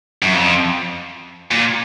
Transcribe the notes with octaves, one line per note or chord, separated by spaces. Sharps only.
F#2
F2
A#2